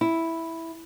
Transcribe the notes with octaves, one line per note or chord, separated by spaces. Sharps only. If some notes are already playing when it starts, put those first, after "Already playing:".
E4